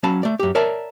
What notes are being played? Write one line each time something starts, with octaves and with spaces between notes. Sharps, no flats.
F#3 C#4 F5 A5 B5
A3 D5
F#2 G4
A#4 C#5 D5 E5 A5